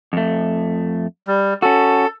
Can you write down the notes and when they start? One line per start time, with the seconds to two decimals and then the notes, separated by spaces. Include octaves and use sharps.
0.13 F2 A3
1.27 G3
1.62 C#4 F#4 A4